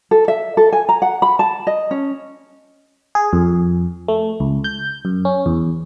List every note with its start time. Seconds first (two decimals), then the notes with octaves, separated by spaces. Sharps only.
0.11 A4
0.28 E5
0.57 A4
0.72 G#5
0.89 A#5
1.02 F#5
1.22 B5
1.39 A5
1.67 D#5
1.91 C#4
3.15 G#4
3.33 F2
4.08 A3
4.40 C#2
4.64 G6
5.05 F#2
5.25 C#4
5.46 E2